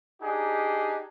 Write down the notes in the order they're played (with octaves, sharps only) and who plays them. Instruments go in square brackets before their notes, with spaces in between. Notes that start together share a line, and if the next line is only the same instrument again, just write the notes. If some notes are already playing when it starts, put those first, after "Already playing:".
[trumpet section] D4 D#4 G4 G#4